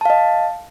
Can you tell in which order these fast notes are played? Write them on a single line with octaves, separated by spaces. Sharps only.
A5 F5 D#5